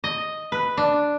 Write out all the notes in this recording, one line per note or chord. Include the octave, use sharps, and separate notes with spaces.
D#5
B4
D4